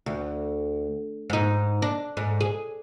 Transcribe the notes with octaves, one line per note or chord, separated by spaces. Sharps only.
D2
G#2 D#4
D4
G#2
G#4